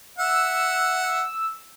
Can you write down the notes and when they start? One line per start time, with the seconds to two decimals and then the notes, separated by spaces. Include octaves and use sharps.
0.18 E5 F#5 E6